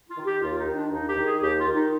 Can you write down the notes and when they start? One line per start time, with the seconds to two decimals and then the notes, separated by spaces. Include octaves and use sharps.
0.08 F4
0.17 D#3
0.25 G4
0.41 D#2 F4
0.58 D#4
0.67 D#3
0.75 D4
0.91 D#2 D#4
1.08 G4
1.17 D#3
1.25 G#4
1.41 D#2 G4
1.58 F4
1.67 D#3
1.75 D#4